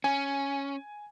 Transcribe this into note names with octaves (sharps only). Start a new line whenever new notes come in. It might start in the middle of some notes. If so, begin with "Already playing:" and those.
C#4 G#5